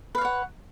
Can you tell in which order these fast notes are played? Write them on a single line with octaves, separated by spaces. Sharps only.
B4 F5 C#5 F#5